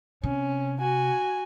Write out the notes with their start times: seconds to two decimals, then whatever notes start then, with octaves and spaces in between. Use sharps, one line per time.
0.24 C3 C#4
0.80 F#4 G#5